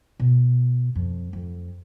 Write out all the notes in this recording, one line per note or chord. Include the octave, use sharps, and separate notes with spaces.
B2
F2
F2